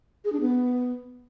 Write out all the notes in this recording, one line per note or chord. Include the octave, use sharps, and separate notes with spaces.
G#4
D4
B3